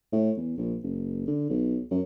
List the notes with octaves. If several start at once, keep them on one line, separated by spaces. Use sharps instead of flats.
A2
E2
A#1
F#1
D3
B1
F#2